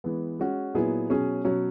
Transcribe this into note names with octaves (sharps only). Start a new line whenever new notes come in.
E3 G#3 B3
G#3 C#4 F#4
A#2 F#3 B3 E4 G#4
B2 F#3 C#4 G#4
B2 F#3 C#4